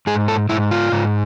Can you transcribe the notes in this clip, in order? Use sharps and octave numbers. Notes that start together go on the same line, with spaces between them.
G#2 G#4
A4
G#2 E4
F4
G#2